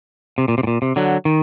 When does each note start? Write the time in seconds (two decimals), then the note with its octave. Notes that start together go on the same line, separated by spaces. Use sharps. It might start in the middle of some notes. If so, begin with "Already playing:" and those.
0.38 C3
0.48 A#2
0.58 C3
0.63 A2
0.67 A#2
0.82 C3
0.96 D3 F#3
1.25 D#3